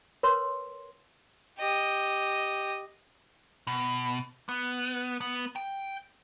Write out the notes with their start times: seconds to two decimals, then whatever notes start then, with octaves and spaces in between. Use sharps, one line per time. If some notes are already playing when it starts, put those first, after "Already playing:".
0.23 A#4 B4 C#5 C6
1.58 G4 D#5
3.67 B2
4.49 B3
5.21 B3
5.56 G5